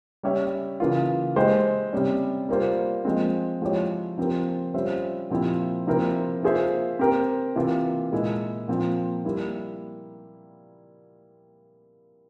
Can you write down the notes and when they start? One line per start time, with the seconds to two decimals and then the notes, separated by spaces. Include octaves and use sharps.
0.23 G3 C#4 G4 C#5 E5
0.80 C#3 E3 A#3 F4
1.36 G#3 E4 G4 C5
1.93 C3 G3 C#4
2.49 G3 A#3 F4 C5
3.05 F3 G#3 C4
3.62 F3 G#3 E4 G4 C#5
4.18 F3 C4 G4 A#4
4.74 G3 C#4 F4 C5 E5
5.30 A#2 F3 C4 E4 G4
5.87 C3 F3 C4 E4 A#4
6.43 A#3 F4 G#4 C5 E5
6.99 C4 G4 A#4
7.56 C3 E3 A#3 F4
8.12 A#2 G#3 E4
8.68 A#2 F3 C4
9.25 G3 A#3 E4